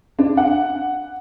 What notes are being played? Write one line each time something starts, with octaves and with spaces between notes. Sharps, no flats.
D4
F#5